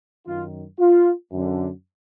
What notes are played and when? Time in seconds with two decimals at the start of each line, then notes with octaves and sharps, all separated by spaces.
0.26 F#2 D#3 F4
0.79 F4
1.31 F#2 D3